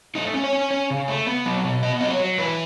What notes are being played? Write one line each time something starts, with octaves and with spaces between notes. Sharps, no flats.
A3 D#4
C#4
C#5
C#4
C#4
C#3
A3
B3
F#3
B2
B3 D#5
F#3 D#5
C#5
F#3
E3 B4